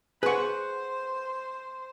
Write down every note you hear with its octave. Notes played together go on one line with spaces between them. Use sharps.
G#4 B4 C5 F#5 C#6